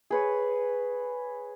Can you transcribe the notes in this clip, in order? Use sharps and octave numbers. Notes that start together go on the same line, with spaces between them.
G#4 B4 C#5